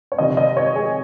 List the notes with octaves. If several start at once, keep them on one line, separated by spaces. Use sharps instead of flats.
C#5
F2 C3 D#3 D#5
D#5
C#5
G#4